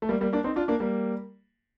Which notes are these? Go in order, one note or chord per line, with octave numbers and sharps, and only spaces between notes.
A3
G3 A#3
G3 A#3
A#3 D4
C4 D#4
D4 F4
A#3 D4
G3 A#3